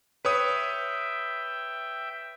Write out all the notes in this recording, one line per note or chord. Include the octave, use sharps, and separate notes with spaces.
B4 C#5 E5 G5 D#6